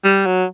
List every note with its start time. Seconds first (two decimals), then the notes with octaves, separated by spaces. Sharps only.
0.04 G3
0.26 F#3